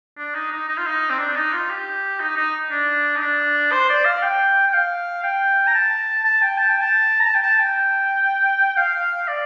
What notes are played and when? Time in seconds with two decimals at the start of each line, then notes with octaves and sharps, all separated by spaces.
0.18 D4
0.35 D#4
0.52 D#4
0.69 D#4
0.78 F4
0.87 D#4
1.10 C4
1.19 D4
1.36 D#4
1.53 F4
1.70 G4
2.20 D#4
2.37 D#4
2.71 D4
3.16 D#4
3.21 D4
3.72 C5
3.89 D5
4.05 F5
4.22 G5
4.68 G5
4.74 F5
5.24 G5
5.67 A#5
5.75 A5
6.25 A5
6.42 G5
6.58 A5
6.70 G5
6.81 A5
7.20 A#5
7.27 A5
7.35 G5
7.43 A5
7.60 G5
8.77 F5
9.28 D5